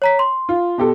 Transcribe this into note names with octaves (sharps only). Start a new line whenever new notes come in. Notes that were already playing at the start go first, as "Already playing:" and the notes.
C#5 A#5 B6
C6
F4
B2 G4 A4